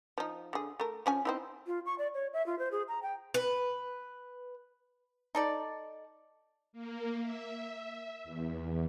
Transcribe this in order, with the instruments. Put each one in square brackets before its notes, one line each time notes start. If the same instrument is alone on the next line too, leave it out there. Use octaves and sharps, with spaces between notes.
[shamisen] F3 D#4
D3 G#4
A3 A#4
F3 C#4 G#5
C4 D#4 E4
[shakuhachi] F4
C#6
D5
C#5
E5
F4
C5
G#4
A#5
G5
[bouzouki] B4
[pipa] D#4 A4 D5
[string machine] A#3
E5
E2